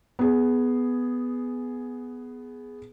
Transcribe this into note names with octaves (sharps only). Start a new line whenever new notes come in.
B3 G#4